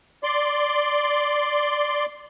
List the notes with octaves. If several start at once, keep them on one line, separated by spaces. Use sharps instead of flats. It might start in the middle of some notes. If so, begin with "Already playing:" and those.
D5 C6